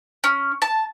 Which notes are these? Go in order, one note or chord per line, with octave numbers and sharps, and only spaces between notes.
C#4
A5